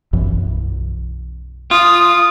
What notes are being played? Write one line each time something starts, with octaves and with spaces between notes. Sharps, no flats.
B1 F#2 E3
F4 D#6